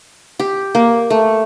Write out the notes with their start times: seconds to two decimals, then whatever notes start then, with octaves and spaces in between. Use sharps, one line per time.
0.39 G4
0.75 A#3
1.10 A3